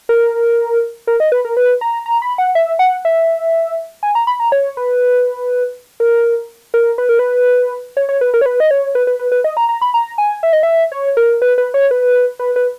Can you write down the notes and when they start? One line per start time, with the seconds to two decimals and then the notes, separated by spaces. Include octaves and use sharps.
0.09 A#4
1.07 A#4
1.20 D#5
1.32 B4
1.45 A#4
1.57 B4
1.81 A#5
2.06 A#5
2.22 B5
2.38 F#5
2.55 E5
2.79 F#5
3.05 E5
4.03 G#5
4.15 A#5
4.27 B5
4.40 A#5
4.52 C#5
4.77 B4
6.00 A#4
6.74 A#4
6.98 B4
7.09 A#4
7.19 B4
7.97 C#5
8.09 C#5
8.21 B4
8.34 A#4
8.41 C#5
8.46 B4
8.60 D#5
8.71 C#5
8.95 B4
9.07 B4
9.19 B4
9.32 B4
9.44 D#5
9.57 A#5
9.69 A#5
9.81 B5
9.94 A#5
10.18 G#5
10.43 E5
10.53 D#5
10.63 E5
10.92 C#5
11.17 A#4
11.42 B4
11.58 B4
11.74 C#5
11.91 B4
12.39 B4
12.56 B4